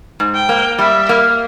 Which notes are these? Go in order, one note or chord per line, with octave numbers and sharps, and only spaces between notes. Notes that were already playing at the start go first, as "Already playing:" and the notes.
G#2
G5
A#3
G3 E5
A#3